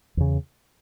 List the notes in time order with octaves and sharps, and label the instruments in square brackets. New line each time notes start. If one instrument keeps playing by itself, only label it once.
[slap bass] E2 C#3